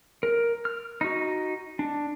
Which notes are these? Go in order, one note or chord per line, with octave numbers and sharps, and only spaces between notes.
A#4
F6
D#4 F#4
D4